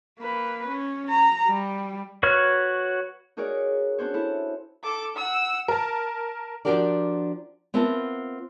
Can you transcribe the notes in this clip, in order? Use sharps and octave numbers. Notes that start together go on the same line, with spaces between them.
A#3 B4
C#4
A#5
G3
F#4 B4 C#5 F6
D#4 F#4 G#4 A#4 C#5 D5
C#4 D4 F#4 C5 C#5
E4 A4
A4 D6
F#5 E6
A#4 A5
F3 D4 F#4 G4 A#4 D5
B3 C4 F4 A#4 E5 A5